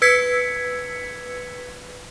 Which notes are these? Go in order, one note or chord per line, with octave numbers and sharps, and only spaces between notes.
B4 E6 G#6 B6 C#7